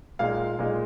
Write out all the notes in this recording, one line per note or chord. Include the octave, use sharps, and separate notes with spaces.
A#2 G#3 D#4 F5
A#2 G#3 D#4